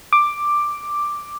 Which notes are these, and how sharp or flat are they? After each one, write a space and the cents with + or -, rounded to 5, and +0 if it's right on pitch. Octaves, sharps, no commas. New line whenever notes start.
D6 +5